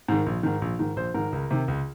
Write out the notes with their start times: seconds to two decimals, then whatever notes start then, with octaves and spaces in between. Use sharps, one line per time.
0.08 G#2 D#3
0.26 A#1
0.43 G#2 D#3
0.62 A#1
0.79 G#2 D#3
0.96 A#1 C5
1.14 G#2 D#3 A#4
1.32 C#2
1.51 C3 D#3
1.68 C#2